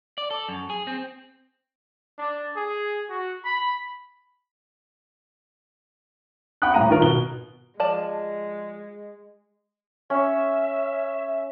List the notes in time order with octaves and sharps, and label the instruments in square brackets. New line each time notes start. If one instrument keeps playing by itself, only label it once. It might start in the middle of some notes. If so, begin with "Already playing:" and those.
[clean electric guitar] D5
A4
F#2
G#4
C4
[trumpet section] D4
G#4
F#4
B5
[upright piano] F#5 G5 B5 D#6 F#6
D#1 A2 F5 A#5 D#7
D#3 F4 A#4
B2 G7
[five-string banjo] F3 D5 A5 [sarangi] G#3
[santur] C#4 [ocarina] E5